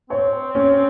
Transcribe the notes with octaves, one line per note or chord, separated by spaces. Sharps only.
C4 C#5
C#4